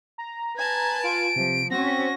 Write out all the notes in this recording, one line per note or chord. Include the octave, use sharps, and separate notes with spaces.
A#5
B4 G#5 A5 G#6
F4 D7
C3 F3
C4 C#4 F#4 A#6